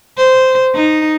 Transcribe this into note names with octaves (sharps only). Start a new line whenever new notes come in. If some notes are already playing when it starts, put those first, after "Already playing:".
C5
D#4